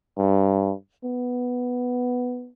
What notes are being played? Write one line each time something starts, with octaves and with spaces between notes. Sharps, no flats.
G2
B3